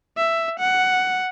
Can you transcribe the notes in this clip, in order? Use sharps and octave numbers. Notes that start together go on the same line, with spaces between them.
E5
F#5